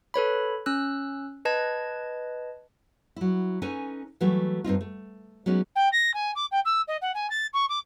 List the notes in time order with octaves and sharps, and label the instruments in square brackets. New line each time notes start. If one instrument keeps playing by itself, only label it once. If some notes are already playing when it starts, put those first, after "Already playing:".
[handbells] A4 B4 C#5 B5
C#4 E6 F#6
B4 D#5 A5 G#6
[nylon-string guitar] F#3 E4
C#4 D#4 A4 B4 G#5
E3 F#3 G3 A3 G4
G2 C4 D#4 F4
A3
F#3 G#3 B3 C#4 D#4
[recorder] G5
A#6
G#5
D6
G5
E6
D#5
F#5
G#5
A6
C#6
D6